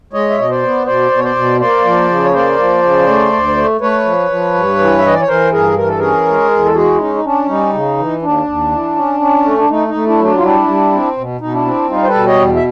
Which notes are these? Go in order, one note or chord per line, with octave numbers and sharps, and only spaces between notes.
G#3 C#5 D#5
E5
B2 D#5
C5 D5
B3
B2 C5 D5
B2
C#5
C5 D5
B2
A#3 C5 D5
F3
C#3
C#5
A#3 C5 D5
F3
C#3
A3
D2
A3
A3 B4 C#5
F3
F3
G2
E3
E5
E3 D#5
D5
C#5
E3 A#4 C5
G2 G#4 A#4
E3 A#4
A4
C#4 G#4 A#4
G#3
E2
A4
G#3 F#4 G#4
E4
C#4 D#4
D#4
C#4 D4
G3 D#4
C#3
E3
D#2 D4
D#2
E3
C#4
C#4
A3
D4
A3 D#4
D#4
A3
D4 E4
F#3
D4
F4
G3 D4 E4
G3
C4
B2
B2 D#4
D4 E4
C4
G3 D#4 F4
C5
A4 B4
B2
C#5 D#5
E2
E5